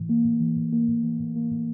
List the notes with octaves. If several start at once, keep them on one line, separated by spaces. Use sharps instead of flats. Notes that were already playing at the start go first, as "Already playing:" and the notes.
Already playing: A2 E3
A#3
A2
E3
A2
A#3
A2
E3
A2
A#3
A2